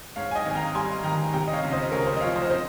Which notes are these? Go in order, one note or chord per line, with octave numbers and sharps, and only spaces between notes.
G#2 C#5 F5
G#5
D#5 G5
G#1 G#5
G5 A#5
G3 G#5 C6
D#3 G5 A#5
C3 G5 A#5
D#5
C#5 F5
C#2
C5 D#5
C#2 A#4 C#5
C5
D#5
F3 C#5 F5
C5 D#5
C5 D#5